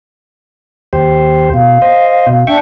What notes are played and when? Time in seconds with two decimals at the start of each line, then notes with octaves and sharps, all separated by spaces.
0.93 D#2 G4 C5
1.54 B2 F5
1.82 C5 D#5
2.27 B2
2.47 D4 E5 G5 C#6